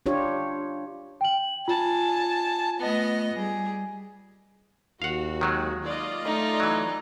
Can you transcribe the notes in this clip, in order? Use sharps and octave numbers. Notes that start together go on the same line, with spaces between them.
D4 F4 G4 C#5
G5 F#7
F4 G#5 A5
A3 B3 D#5
G3 G#4
D#2 F#4 F5 F#5
D#3 F#3 G#3
F4 D5 D#5
A3 D#4
E3 F#3